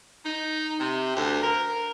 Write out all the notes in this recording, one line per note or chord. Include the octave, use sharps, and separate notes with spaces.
D#4
C3
D2
A#4